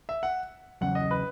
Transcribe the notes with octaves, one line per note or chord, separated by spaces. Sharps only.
E5
F#5
E2 C#3 F#3 C#4 F#5
D#5
B4